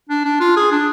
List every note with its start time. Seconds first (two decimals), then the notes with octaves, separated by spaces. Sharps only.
0.09 D4
0.25 D4
0.40 F4
0.56 G#4
0.72 D4